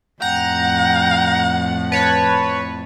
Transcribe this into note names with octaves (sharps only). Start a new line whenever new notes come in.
F2 A2 F#5 G5 A#5
B4 C#5 A5